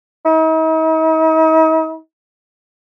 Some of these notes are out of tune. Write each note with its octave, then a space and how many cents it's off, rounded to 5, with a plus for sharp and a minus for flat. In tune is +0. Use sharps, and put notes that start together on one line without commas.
D#4 +45